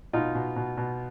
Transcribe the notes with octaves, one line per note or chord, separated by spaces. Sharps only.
B2 D#4 F4
B2
B2
B2